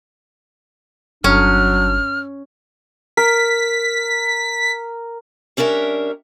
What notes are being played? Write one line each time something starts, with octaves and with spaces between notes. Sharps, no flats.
G1 F#3 C#4 D4 F6
A#4 B6
G3 C#4 D4 A#4 E5